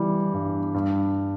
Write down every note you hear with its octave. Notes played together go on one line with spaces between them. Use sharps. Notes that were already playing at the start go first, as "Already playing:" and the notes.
Already playing: E3 G3
G2
G2